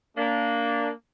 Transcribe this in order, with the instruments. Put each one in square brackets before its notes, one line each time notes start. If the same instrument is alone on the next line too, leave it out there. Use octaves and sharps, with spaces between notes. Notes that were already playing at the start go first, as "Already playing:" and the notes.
[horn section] A#3 D4